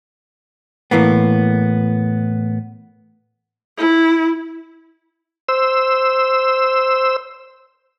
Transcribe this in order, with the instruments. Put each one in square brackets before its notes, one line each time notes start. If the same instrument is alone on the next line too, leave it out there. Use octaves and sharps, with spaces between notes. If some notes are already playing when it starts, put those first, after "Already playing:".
[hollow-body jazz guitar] A2 E3 A#3 B3
[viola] E4
[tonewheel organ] C5 E6